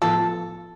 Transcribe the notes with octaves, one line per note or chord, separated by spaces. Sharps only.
A2 F3 B3 F4 A4